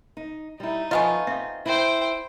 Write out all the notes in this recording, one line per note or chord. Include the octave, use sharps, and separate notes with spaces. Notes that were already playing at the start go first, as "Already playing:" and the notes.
D#4
G3 D#4 E4
F3 A3 B3 F4 D#5 F#5 G#5
C4 E5 F5
E4 C5 G5